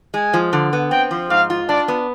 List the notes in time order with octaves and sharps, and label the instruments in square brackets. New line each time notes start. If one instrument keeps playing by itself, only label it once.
[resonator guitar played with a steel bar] G#3 [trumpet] G#5
[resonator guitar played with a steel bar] F3
D3
B3
[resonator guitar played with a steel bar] C4 [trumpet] G5
[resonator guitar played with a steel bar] F3
[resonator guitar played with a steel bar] G#2 [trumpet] F5
[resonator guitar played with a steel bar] F4
[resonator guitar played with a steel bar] D4 [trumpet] D5
[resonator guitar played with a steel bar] B3